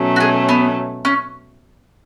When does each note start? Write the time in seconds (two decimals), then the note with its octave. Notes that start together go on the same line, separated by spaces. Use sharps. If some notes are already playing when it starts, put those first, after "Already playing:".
Already playing: B2 F#3 A3 C#4
0.16 F#4
0.20 G#4
0.49 B3
1.05 C#4